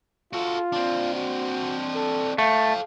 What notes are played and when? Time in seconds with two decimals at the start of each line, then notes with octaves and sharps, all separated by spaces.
0.33 F4 F#4 A4
0.72 C4 D4
1.15 F#4
1.95 A4
2.38 A3 A4 F5 G5